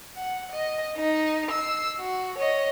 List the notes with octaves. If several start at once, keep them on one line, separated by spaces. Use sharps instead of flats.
F#5
D#5
D#4
E6 C7
F#4
C#5 D#5